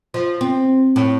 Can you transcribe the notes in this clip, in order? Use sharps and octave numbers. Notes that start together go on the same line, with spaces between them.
F3
C4
A2